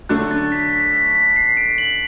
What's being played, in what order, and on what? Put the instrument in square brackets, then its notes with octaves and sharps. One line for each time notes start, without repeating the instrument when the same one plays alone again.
[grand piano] D3 F#3 A3 D4 [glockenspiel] F#6
[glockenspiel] A6
B6
B6
B6
B6
C7
D7
F#7